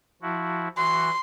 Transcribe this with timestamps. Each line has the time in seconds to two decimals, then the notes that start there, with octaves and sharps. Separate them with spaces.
0.22 F3 E4 F#4
0.77 E3 F#4 C6